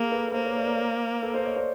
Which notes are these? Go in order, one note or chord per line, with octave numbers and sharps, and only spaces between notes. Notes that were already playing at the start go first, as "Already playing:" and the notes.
Already playing: A#3 G#4 A#4
A4 B4
B4
A#3 A#4 C5
B4 C#5
C5 D5
A#4 C5
A4 B4
A#4 C5
C#5 D#5
C5 D5